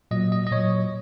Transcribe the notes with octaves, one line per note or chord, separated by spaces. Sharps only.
A#2 F#3 D#5
D#5
D#5
A#2 F#3 C#5